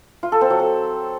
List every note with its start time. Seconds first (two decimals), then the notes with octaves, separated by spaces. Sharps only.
0.23 F4
0.32 A4
0.41 C4
0.50 F#3
0.59 A4